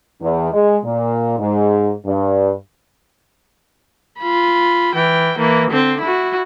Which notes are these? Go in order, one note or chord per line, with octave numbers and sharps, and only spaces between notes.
E2
G#3
A#2
G#2
G2
F4 B5
E3 G5
E3 A#3
D3 C4
E4 F#4